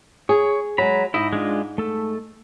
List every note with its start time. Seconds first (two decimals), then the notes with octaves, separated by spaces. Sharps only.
0.29 G#4 C#5
0.78 F#3 G#3 A#5 B5
1.14 G#2 D#4 E4 D#5
1.33 G#3 D4 F4
1.78 A3 A4